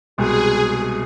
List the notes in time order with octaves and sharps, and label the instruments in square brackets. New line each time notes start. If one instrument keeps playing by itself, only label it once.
[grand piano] C2 B2 G#3 [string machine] G#4